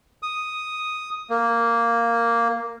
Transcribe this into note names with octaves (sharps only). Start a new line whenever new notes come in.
D#6
A#3